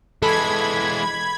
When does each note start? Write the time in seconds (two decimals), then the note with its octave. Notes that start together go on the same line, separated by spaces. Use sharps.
0.23 E3 G#3 A4 B5 G#6